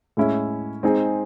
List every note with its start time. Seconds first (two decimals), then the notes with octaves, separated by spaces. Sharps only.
0.17 A2 G#3 C#4 E4
0.83 G#3 C4 D#4 G#4